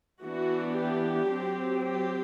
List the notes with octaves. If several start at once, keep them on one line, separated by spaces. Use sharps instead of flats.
E3 B3 D4 F#4
G4
F#3 C4
G4